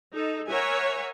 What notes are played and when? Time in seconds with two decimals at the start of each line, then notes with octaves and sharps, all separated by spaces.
0.13 D#4 A4
0.48 A#4 C#5 E5 F#5 G#5